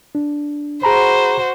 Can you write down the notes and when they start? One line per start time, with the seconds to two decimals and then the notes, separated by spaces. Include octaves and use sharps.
0.15 D4
0.83 F#4 G#4 C5 A#5 B5